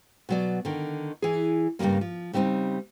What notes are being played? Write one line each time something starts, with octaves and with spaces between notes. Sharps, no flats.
B2 F#3 D5
D3 D#3
E3 G#4
G2 C#3 G3 G#3 A#3
F3
C#3 G3 C4 D4 D#4